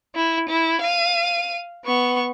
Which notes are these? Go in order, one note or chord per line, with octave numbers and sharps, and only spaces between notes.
E4
E4
F5 D#7
B3 C#6